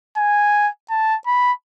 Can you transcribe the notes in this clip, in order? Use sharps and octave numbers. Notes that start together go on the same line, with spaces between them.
G#5
A5
B5